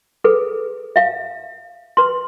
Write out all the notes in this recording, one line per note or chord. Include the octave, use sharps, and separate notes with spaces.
G#4 A4 B4
E5 F5
B4 C6